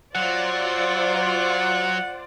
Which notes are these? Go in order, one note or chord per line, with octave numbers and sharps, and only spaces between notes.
F#3 F4 C5 D5 F#5